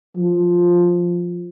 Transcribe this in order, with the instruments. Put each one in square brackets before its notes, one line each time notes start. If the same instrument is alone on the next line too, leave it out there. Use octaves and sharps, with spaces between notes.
[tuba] F3